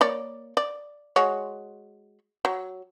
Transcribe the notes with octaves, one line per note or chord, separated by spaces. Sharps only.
A#3 C#5 D5
D5
G#3 F#4 C#5
F#3